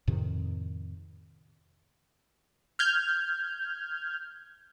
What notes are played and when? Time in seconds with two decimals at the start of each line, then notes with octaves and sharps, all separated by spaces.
0.08 F2 A2 C3 D#3
2.79 F6 G6 G#6